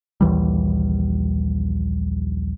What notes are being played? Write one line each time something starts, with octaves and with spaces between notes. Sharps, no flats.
A#1 D#2 E3 G3